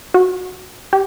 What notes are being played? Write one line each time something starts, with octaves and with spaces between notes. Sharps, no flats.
F#4
G4